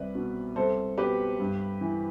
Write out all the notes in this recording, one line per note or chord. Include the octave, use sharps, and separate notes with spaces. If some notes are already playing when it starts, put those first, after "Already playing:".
Already playing: C2 B4 D5
B2
C2 A4 C5
B2 G4 B4
G2
E3